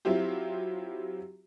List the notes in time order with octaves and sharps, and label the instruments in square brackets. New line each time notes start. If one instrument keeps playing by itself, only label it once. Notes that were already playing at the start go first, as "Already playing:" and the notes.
[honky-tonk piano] F#3 C4 E4 F4 G4